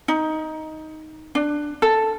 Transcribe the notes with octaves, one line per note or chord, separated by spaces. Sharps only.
D#4
D4
A4